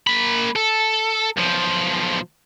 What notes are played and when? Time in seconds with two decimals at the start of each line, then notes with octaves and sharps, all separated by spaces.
0.07 A#3 B5
0.56 A4
1.37 B1 F3